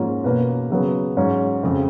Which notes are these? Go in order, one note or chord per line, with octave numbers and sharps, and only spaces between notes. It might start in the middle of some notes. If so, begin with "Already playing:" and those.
Already playing: G#2 F3 A#3 C#4
B2 A#3 C#4 B4
C#3 F#3 B3
G#2 F#3 C#4
F2 C#3 G#3